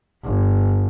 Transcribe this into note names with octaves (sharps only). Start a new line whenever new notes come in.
G1